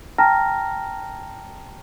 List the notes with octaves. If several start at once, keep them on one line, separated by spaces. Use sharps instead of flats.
G5 A5 A#5 F6 A#6